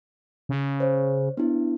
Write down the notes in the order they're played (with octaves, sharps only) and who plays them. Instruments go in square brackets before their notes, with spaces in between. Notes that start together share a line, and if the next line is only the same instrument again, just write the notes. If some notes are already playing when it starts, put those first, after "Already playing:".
[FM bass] C#3
[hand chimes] C5 C#5
B3 D4 E4